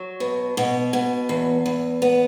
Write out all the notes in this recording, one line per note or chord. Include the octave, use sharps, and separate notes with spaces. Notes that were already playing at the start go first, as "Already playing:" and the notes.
Already playing: F#3
B2
B2
B2
E2
E2
B3